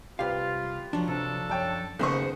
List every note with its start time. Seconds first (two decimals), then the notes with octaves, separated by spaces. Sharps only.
0.19 C2 F4 G4 B4 F5
0.93 F3 F#3 D4
1.08 C3 D4 A4
1.49 F#2 C#5 G5 A5
1.99 F#1 D#3 B3 G#4 C5 F#5 C#6